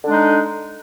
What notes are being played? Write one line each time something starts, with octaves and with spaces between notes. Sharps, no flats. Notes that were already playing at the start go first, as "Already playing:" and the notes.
D3 G#3 D4 D#4